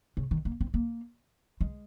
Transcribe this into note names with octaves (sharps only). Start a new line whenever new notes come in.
C#3
D#3
A#3
C4
A#3
G#3